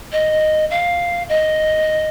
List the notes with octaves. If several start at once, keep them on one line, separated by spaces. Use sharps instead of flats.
D#5
F5
D#5